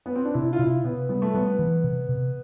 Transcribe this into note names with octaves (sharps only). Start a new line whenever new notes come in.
B3
C4
D4
C3 E4
F4
C3 E4
C3 B3
G3 B3
A3
G3 B3
E3
C3
C3